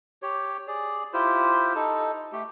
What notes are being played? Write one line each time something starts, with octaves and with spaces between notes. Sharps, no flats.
G4 C#5
G#4 D5
E4 F4 G4 C5
D#4 A4
A3 G4